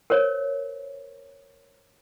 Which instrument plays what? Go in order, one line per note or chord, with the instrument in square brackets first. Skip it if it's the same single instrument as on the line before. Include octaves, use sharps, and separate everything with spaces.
[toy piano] A#4 C5 C#5